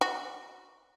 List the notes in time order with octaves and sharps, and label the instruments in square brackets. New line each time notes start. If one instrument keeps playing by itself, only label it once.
[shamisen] F#4